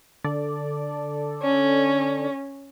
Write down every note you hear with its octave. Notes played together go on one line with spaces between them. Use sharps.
D3 A4 D5
C#4